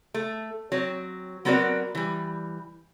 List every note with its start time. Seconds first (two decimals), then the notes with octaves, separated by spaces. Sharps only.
0.14 A3
0.72 F#3 C4
1.45 F#3 B3 C4 F#4 A#4 D5
1.95 E3 G3